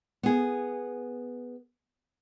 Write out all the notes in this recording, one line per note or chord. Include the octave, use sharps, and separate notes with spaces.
B3 G#4